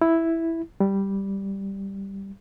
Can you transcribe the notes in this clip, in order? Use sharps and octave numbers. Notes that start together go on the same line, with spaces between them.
E4
G3